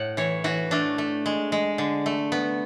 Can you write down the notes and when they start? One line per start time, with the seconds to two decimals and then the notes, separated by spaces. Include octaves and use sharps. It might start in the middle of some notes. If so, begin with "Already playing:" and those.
Already playing: A2 F#5
0.17 E3 C#5
0.44 E3 F#4
0.71 A3 D4
0.98 A3
1.26 G#3
1.52 G#3
1.78 D3
2.06 A3
2.32 B3